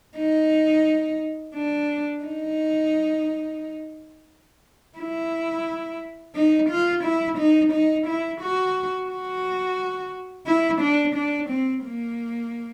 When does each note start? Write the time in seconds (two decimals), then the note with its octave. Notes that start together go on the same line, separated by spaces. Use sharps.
0.18 D#4
1.55 D4
2.23 D#4
4.98 E4
6.35 D#4
6.70 F4
7.04 E4
7.38 D#4
7.72 D#4
8.07 E4
8.41 F#4
9.09 F#4
10.47 E4
10.81 D4
11.15 D4
11.50 C4
11.84 A#3